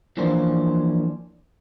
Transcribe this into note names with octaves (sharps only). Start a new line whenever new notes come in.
E3 F3 A#3 C#4 D4 C5